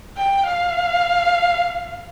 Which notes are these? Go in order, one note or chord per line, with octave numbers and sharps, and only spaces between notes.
G5
F5